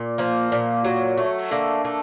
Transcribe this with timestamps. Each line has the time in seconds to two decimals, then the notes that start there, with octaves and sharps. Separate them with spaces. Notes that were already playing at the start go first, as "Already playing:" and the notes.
Already playing: A#2
0.18 F3 A#3
0.52 A#2
0.85 F#3
1.17 A3
1.51 D3 A#3
1.85 A3